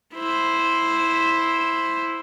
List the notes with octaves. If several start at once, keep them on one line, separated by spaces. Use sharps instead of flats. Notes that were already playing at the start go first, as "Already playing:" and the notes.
E4 C5